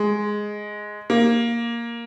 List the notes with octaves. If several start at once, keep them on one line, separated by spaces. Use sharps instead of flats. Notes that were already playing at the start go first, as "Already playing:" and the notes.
Already playing: G#3
A#3